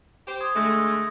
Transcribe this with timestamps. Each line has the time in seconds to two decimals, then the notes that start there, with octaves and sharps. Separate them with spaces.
0.28 G4 C5
0.41 C6 D#6 G#6
0.56 D3 G#3 A3 D#6 A#6